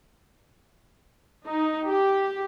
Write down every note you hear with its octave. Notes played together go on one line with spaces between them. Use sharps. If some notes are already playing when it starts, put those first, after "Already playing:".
D#4
G4